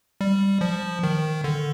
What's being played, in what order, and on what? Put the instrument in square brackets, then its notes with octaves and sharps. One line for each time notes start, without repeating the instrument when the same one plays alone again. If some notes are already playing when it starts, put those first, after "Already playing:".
[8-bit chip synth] G3
F3
D#3
D3